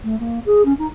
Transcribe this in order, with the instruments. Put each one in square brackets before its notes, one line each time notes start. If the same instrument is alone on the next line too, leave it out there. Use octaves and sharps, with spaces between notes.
[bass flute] A3
A#3
G#4
C#4
D#4